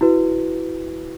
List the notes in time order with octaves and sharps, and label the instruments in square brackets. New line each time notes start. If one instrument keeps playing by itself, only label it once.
[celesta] E4 F#4 B4